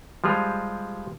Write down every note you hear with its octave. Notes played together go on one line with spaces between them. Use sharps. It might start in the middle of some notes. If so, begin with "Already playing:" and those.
F3 G3 G#3 F4